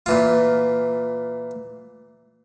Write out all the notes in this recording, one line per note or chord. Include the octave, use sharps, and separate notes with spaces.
A#2 E3 F4